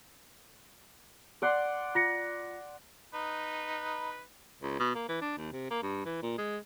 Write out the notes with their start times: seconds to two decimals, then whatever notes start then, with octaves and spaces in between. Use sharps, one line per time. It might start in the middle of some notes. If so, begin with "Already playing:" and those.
1.42 D5 F#5 C6
1.95 F4 A#6 C#7
3.14 D#4 B4
4.62 C#2
4.79 B2
4.95 A#3
5.09 E3
5.21 D4
5.38 D#2
5.52 C3
5.70 A#3
5.83 G2
6.05 E3
6.22 A#2
6.38 G#3